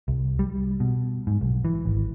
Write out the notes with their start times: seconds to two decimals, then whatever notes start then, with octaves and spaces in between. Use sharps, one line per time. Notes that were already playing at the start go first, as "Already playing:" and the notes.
0.08 C2
0.39 G3
0.80 B2
1.27 G#2
1.41 B1
1.65 E3
1.85 G#1